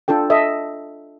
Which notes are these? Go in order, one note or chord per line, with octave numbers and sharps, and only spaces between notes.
D4 F4 A4 G5
A4 D#5 E5